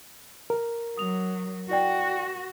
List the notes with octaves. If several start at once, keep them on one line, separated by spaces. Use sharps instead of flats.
A#4
F#3 D#6 F7
E4 F#4 D5 G5